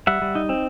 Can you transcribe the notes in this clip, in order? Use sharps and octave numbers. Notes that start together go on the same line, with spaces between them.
G3 E5 F#5
G3
D#4
C4